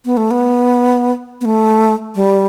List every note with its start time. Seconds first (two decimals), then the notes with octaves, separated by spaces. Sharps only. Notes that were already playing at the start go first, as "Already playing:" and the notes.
0.05 B3
0.17 A3
0.31 B3
1.41 B3
1.45 A3
2.15 G3